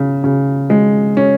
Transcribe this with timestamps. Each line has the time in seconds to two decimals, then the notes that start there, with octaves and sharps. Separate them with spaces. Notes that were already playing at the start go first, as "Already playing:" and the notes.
Already playing: C#3
0.24 C#3
0.70 G#3
1.17 C#4